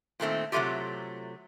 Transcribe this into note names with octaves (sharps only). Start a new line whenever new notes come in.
A#2 D#3 A3 C4
C3 F#3 G#3 A3 F4 G4